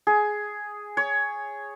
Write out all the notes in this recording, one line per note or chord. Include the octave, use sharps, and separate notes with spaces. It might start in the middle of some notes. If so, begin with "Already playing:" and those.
G#4
C#5